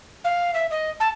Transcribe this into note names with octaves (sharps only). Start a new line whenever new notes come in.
F5
E5
D#5
A5